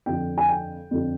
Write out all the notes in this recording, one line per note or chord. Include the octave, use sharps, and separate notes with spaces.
F2 D3 F3 G5
G#5
G5
F2 D3 F3